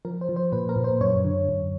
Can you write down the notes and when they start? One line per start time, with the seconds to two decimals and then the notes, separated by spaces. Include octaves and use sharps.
0.05 F3 A#4
0.21 C5
0.29 F3
0.36 C5
0.52 A#2 B4
0.69 A#4
0.76 A#2
0.84 C5
1.01 F#2 C#5
1.25 D3
1.49 F#2